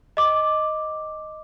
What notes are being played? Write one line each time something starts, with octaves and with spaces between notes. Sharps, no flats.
D#5 D6